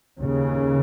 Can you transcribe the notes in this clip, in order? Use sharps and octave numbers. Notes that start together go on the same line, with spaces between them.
D#2 C#3